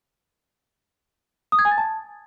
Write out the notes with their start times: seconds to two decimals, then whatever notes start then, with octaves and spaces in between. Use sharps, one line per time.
1.52 D#6
1.59 G#6
1.65 G#5
1.71 A6
1.78 A5